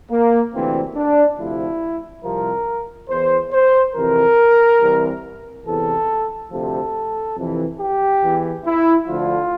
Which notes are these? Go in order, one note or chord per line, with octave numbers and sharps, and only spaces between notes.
A#3
D2 C3 E3 C4
D4
D2 C3 F3 E4
C2 C3 F3 A#4
E2 E3 C5
C5
F2 C3 E3 A#4
C2 C3 E3
E2 C3 E3 A4
D2 C3 F3 A4
F2 C3 E3
G4
E2 E3
E4
D2 D3 F3 F4